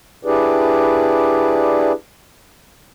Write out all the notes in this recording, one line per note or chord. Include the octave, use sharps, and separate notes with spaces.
D4 E4 G4 G#4 B4 D5